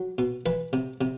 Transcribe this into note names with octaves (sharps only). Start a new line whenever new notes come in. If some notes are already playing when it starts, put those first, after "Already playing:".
Already playing: F#3
B2
E3 B4
C3
C3